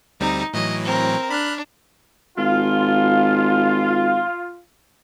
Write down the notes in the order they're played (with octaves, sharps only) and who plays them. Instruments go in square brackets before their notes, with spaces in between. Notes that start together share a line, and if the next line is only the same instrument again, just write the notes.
[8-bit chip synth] D2 G3 C4 [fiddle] D#4
[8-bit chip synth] A2 E3 F#3 [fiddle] D#5
[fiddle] C4 A#4
[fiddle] D4 [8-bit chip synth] B5 F6 F#6
[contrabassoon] G#1 [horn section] F4